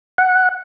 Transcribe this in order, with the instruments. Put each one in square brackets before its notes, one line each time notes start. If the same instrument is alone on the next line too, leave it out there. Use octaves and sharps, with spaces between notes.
[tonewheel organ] F#5